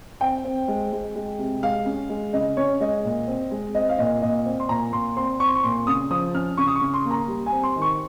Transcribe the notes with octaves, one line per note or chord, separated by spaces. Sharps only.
C4 G5
C4
G#3
G#3
G#3
C3
G#3 F5
C#4
G#3
C#3 D#5
C#4 C#5
G#3 D#5
A#2
C4
G#3
C4 D#5
F5
A#2 D#5
A#2 D#5
C4
C6
A#2 A#5
A#2 C6
C4 C6
C4 C#6
C6
C#6
A#2 C6
C#3 D#6
F3 D#6
C#4 F6
C#3 C#6
D#6
C#6
C#3
C6
A#3
A#5
G3
G#5
C4
C6
D#3
C#6